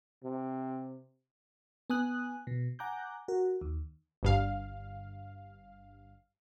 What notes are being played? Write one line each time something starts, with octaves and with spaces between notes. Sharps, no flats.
C3
B3 G#5 D#6 F#6
B2
F#5 G#5 A#5 D6 F#6 G6
F#4 A#4
D#2
G1 G2 F5